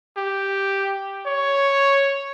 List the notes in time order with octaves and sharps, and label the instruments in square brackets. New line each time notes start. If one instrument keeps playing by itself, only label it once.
[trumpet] G4
C#5